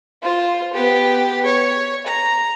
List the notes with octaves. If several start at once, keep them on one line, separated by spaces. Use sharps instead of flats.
F4 C5
B3 G4
C#5
A#5